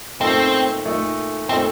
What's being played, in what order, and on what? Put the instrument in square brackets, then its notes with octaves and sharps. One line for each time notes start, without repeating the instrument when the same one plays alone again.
[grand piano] A#2 A3 D#4 A4 D#5 [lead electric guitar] C4
[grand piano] A#2 A3 D#4 A4 D#5
[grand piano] A#2 A3 D#4 A4 D#5 [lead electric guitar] C4